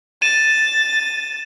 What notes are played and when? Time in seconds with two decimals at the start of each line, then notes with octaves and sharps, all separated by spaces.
0.22 A6 D#7 E7